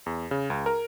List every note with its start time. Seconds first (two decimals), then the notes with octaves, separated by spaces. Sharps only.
0.06 E2
0.31 C#3
0.50 C#2
0.66 A#4